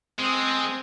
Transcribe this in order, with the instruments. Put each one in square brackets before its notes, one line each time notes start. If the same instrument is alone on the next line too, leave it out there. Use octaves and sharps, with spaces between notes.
[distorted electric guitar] G#3 [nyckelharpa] C4 D#6